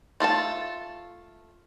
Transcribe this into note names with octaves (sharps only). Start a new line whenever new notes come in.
A3 F4 A4 A5